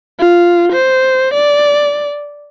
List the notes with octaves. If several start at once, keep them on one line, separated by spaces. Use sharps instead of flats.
F4
C5
D5